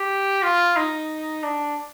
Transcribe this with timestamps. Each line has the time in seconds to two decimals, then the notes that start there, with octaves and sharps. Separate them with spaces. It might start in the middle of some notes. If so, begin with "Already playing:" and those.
Already playing: G4
0.43 F4
0.76 D#4
1.43 D4